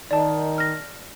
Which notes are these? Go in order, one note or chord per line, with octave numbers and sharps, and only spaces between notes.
D#3 D5 A5
F6 A#6